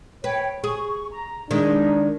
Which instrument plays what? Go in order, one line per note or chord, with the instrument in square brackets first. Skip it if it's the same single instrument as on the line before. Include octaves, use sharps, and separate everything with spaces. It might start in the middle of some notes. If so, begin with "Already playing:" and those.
[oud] B4 [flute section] C#5 G5
[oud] G#4 [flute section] C#6
[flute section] A#5
[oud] D#3 G#3 [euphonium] D4 [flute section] D#4